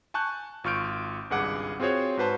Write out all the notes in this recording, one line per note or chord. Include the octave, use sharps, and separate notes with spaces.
G#5 A5 C#6 F#6 G6
G#1 F4 C#6 F6 G6 D7
G#1 C#2 G2 G#4 F#5 D6
C4 F4 F#4 G#4 C5 C#5
G#2 F#4 B4 C5 A5